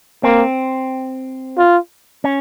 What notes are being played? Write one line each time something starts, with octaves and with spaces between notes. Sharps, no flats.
A#3 C4
F4
C#4